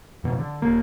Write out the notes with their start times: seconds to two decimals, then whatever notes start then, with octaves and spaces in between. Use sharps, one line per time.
0.24 F2 B2
0.38 D3
0.62 D#1 A#3